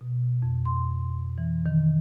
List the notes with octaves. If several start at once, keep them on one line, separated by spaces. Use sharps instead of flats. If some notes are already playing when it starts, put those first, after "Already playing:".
B2
F2
C6
E3
D#3